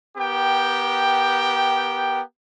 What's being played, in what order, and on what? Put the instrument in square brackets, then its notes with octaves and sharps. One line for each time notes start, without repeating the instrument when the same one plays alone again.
[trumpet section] B3 G4 A#4 G5